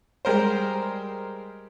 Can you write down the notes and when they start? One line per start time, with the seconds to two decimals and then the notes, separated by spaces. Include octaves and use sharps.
0.25 G3 G#3 A#4 C5